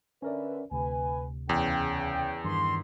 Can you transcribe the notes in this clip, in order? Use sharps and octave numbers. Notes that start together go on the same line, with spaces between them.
D3 C#4 A#4 B4 D5 E5
D2 C3 B4 G#5
E2 C#3 G5
G2 D#3 E3 C6